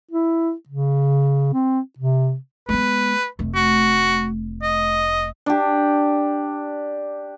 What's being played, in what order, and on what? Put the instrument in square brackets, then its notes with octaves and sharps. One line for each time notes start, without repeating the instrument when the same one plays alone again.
[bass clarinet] E4
C#3
C4
C3
[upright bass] G#3 B3 [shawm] B4
[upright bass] F1 A3
[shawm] F#4
D#5
[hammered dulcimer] D4 G4